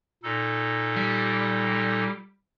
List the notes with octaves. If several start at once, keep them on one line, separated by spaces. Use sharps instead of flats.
A#2 D#4 A4
G3